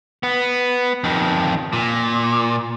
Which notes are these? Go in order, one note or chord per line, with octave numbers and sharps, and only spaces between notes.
B3
F2 D#3
A#2